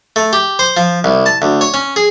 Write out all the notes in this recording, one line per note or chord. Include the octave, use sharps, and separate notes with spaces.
A3
G4
C5
F3
C2
A5
D2
C#5
C#4
G#4